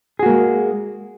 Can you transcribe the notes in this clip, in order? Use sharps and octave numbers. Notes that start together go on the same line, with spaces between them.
G#3 A#3 F#4 G#4